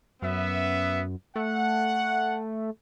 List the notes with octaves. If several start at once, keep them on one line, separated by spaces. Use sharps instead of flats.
F#2 B3 E5
A3 F#5